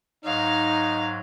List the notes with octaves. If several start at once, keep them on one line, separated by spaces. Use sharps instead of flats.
G#2 F#3 D#4 F5